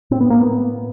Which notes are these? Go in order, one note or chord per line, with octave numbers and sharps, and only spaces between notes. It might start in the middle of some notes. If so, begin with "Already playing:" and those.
A2 C4
B3
A#3
B3